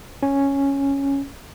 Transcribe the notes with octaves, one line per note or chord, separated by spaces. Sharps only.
C#4